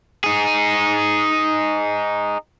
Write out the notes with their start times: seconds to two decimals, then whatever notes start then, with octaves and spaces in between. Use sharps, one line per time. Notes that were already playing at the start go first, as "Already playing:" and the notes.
0.24 D#4 G#4